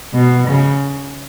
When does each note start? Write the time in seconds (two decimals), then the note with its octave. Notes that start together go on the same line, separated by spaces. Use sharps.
0.14 B2
0.47 C#3